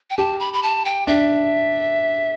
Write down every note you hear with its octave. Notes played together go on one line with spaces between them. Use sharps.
G5
G4 A5
B5
B5
A5
G5
D4 E5